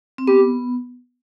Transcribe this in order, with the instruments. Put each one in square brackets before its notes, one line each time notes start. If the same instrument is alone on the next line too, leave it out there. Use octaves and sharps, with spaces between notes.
[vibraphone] C4
[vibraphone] B3 [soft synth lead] G4